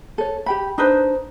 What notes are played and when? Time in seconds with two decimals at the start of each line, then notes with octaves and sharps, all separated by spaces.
0.18 A4 C#5
0.46 G4 G5 B5
0.78 D4 D#4 B4 C5